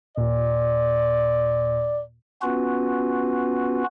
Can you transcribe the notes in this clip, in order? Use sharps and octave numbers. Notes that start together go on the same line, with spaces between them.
D#2 A#2 D5
B3 C#4 F4 F#4 B4